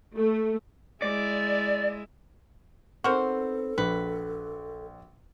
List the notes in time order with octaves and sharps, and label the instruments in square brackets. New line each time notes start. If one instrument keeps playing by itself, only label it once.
[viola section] A3
[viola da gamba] G#3 E4 [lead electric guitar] D5
[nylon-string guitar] B3 C4 D#4 [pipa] F#4 A#4 C5 [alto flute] A4
[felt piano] A#1 [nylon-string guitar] F#4 [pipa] B4